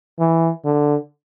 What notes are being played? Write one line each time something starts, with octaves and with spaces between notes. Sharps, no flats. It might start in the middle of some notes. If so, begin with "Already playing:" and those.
E3
D3